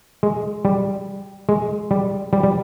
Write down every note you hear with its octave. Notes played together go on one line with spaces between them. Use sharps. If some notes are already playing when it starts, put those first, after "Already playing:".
G#3
G3
G#3
G3
G3
G3